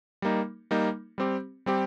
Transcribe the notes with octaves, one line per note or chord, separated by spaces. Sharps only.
G3 A#3 D#4
G3 A#3 D#4
G3 C4 G4
G3 C4 G4